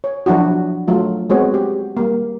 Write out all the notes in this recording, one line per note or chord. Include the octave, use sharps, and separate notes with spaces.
C#5
F3 F#3 D4 E4 F#4
F#3 A3 F4
G#3 B3 C4 F#4 C#5
G4
G3 A#3